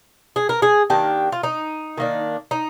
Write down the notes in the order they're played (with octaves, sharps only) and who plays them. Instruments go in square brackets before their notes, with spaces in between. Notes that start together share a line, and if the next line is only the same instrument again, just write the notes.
[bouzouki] G#4
A#4
G#4
D#3 A#3 D4 G4
F4
D#4
D#3 A#3 D4
D#4